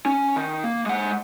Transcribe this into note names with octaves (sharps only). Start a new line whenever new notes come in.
C#4
D#3
A#3
G#3 F#5